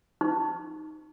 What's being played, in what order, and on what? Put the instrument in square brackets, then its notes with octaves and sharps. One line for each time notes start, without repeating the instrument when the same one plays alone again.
[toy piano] D#4